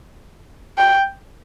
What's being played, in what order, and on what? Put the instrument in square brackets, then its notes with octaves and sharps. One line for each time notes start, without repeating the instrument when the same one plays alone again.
[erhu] G5